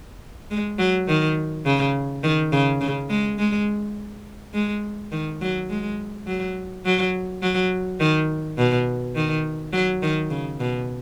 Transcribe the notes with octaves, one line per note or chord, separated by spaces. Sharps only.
G#3
F#3
D#3
C#3
D#3
C#3
C#3
G#3
G#3
G#3
D#3
F#3
G#3
F#3
F#3
F#3
D#3
B2
D#3
F#3
D#3
C#3
B2